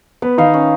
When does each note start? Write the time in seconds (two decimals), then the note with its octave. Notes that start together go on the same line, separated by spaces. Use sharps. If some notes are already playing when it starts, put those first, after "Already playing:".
0.22 B3 B4
0.38 D#3 D#4 F5
0.54 C#4